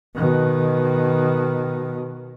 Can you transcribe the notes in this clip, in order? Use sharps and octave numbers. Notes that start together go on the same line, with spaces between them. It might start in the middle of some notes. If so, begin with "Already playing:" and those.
B2 D#3